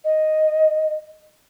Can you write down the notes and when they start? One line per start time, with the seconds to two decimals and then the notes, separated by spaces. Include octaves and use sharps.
0.05 D#5